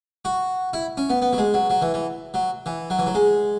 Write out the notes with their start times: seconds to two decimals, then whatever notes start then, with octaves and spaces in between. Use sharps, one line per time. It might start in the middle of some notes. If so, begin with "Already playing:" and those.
0.25 F#4
0.73 E4
0.97 C#4
1.10 B3
1.22 B3
1.33 F#3
1.38 G#3
1.54 F#3
1.70 F#3
1.82 E3
1.94 E3
2.34 F#3
2.66 E3
2.90 F#3
2.99 E3
3.06 F#3
3.15 G#3